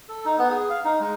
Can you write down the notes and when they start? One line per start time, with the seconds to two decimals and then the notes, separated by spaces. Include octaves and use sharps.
0.09 A4
0.25 D#4
0.39 B3
0.51 G#4
0.70 F5
0.85 D#4
1.00 G#3